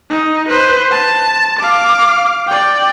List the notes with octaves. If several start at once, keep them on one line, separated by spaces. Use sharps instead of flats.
D#4
B4 C5
A5
F5 D6
D5 G5